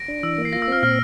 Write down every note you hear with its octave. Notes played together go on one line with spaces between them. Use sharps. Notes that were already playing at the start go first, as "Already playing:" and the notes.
Already playing: A#6 D7
D4
E3 E6
A#3
C7
F4 A#6
E6
C4 F6
A#2 F6